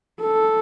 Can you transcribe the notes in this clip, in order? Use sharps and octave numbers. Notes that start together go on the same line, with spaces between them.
A4